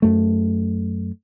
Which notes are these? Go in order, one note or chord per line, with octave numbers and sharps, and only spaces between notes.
F#2 A3